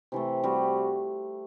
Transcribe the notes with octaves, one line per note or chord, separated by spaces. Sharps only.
C3 E3 A3
G3 C4 F#4